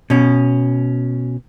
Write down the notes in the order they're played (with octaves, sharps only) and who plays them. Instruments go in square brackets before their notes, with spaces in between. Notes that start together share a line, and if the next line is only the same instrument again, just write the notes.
[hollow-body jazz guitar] B2 C#4